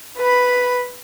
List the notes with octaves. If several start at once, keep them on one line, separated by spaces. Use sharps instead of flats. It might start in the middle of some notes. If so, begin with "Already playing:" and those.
B4 B5